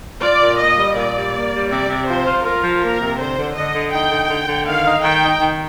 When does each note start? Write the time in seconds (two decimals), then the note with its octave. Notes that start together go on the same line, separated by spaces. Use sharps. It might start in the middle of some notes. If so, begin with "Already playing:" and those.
0.22 F4 D5
0.41 A#2
0.58 A#3 D#5
0.77 G3
0.96 A#2 D5
1.15 G3
1.33 A#3
1.52 G3
1.70 C3 D5
1.89 C3
2.07 F3 C5
2.26 F4
2.44 F4 A#4
2.63 F3
2.81 A#3 A#4
3.00 C3
3.18 D3 C5
3.36 D3
3.55 D3 D#5
3.74 D3
3.92 D#4 G5
4.11 D3
4.30 D3
4.48 D3
4.66 D#3 F5
4.86 D#4
5.03 D#3 G5
5.22 D#4
5.41 D#3